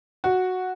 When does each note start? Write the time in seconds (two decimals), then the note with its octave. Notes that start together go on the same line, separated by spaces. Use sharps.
0.24 F#4